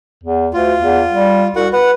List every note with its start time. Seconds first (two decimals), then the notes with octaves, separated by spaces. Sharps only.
0.24 E2
0.53 D2 F4
0.81 E2
1.11 G3
1.56 C2 F#4 F#5
1.73 B4 F#5